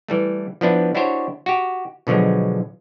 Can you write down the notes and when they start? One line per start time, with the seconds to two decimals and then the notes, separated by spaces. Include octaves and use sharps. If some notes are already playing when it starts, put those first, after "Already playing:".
0.08 E3 G3 A3
0.61 F3 B3 D4 E4
0.95 D4 E4 F#4 G4 C5 C#5
1.46 F#4 G4
2.07 B2 D3 F3 F#3 G#3